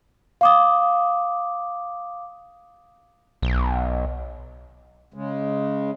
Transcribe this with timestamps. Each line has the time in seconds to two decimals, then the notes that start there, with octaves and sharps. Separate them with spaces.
0.41 F5 D6 D#6
3.42 B1
5.14 C#3 G#3